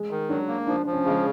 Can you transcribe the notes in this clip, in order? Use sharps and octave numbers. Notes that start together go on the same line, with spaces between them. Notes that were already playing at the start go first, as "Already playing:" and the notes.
Already playing: G#3
D#3
F#3 D4
A#3
F3 D4
F3
C#4
C#3 G#3